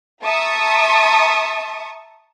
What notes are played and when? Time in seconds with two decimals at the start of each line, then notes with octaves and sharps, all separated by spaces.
0.23 E5 A5 A#5 C#6 D#6